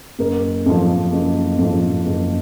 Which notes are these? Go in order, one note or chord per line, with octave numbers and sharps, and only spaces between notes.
F#1 A#4
F2 F3
F#1
F2 F3
F#1